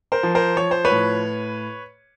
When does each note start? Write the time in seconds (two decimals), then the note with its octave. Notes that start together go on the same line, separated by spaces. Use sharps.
0.12 A#4 C5
0.23 F3
0.35 A#4 C5
0.57 F3 C#5
0.71 C5
0.85 B4 C#5
0.91 A2